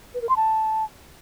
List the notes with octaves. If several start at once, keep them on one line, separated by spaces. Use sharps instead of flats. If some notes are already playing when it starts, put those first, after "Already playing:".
B4
A#4
C6
A5